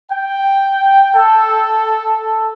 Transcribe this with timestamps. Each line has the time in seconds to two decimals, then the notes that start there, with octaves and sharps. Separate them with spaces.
0.11 G5
1.15 A4